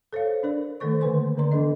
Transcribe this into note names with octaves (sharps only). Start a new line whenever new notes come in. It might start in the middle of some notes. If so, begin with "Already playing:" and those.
A4 C5 C#5 F5
D4 A#4 D5
D#3 A3 A4 C5 C#6
D3 E3 A#3 B4 G#5 C6
D3 D5 A#5 C6
E3 B3 D4 A4 D#5